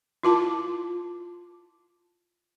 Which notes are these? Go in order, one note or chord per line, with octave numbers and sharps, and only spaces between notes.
E4 F4 A5 D6